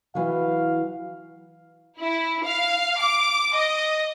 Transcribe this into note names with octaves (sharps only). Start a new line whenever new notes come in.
E3 F#3 F5
E4
F5
D6
D#5